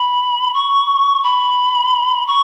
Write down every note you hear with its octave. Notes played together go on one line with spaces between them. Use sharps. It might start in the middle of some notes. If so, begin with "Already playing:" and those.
Already playing: B5
C#6
B5
C#6